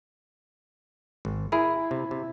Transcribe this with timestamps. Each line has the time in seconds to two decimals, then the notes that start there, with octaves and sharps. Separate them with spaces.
1.25 G#1
1.52 E4 G#4 A#4
1.91 C3
2.11 C3